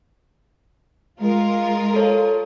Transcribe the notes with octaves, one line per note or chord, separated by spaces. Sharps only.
G#3 F4 A#4
A4 C#5